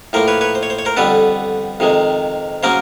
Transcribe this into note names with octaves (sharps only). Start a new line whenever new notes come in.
A2 F3 A#3 A#4 C5
B4 C#5
B4 C#5
C5
C#5
C5
C#5
A#4 C5
F2 D3 G3 B3 A4 B4
F2 C3 D#3 G#3
C#3 F#3 A#3 C#4 A#4 C5